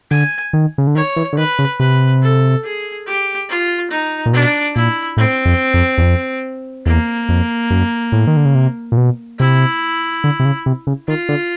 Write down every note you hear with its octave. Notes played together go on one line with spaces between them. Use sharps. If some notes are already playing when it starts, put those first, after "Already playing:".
D3 G#5
D#3
C#3
D3
D#3 C#5
E3
D3
D#3 B4
C#3
C3 B4
A4
G#4
G4
F4
D#4
A#2
B2 D4
A#2 E4
A2 C4
F2
F2
E2
F2
E2 A#3
F2
F#2
A2
D#3
D3
C#3
C3
A#2
B2
C3 E4
D3
C3
C#3
C3
C#3
D#3 F4
D3